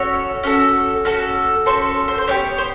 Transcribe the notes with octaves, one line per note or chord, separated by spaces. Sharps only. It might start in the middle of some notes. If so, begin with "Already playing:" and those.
Already playing: C#4 F#4 A4 C#5
C#4 F#4 A4
C#4 F#4 A4
C#4 F#4 A4 C5
C5
C5
B3 D4 G4 C#5
C5